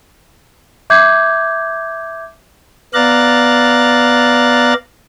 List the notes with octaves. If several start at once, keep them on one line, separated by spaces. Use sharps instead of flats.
E5 D6 G6 G#6
B3 D5 F5 A#5 F#6 A6